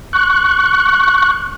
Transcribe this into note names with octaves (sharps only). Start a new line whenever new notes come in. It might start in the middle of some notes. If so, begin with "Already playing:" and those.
C#6 F#6